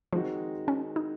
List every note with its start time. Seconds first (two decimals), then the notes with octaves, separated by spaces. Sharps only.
0.13 D#3 F3 G#3 C4 D#4 F#4
0.68 C#4
0.96 D#4